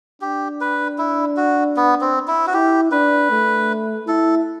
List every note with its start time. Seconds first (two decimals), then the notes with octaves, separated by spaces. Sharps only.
0.21 D4 G4
0.61 B4
0.98 E4
1.37 F#4
1.77 B3
2.01 C4
2.28 E4
2.47 F#4
2.53 E4 G4
2.91 D4 B4
3.31 A3
4.07 E4 A4